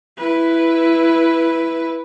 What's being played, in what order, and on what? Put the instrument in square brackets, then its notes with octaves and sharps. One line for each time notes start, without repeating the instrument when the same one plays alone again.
[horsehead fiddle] E4 B4